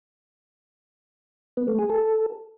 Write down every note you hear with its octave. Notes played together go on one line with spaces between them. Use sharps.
B3
A3
G#4
A4